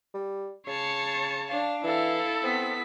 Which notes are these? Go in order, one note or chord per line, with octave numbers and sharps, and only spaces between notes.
G3
C#3 C#5 A5 C7 C#7
D4 F5
E3 E4 A4 F5
B3 C4 B6